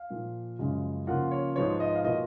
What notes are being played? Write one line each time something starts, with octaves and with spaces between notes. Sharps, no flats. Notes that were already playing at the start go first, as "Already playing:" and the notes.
Already playing: F5
A#2 F3 A#3
F#2 C#3 F3 G#3
C#3 F3 A#3 C#4 F4 F#5
C#5
G#2 F3 G#3 B3 C#5
D#5
F5
B2 A#3 F4 D#5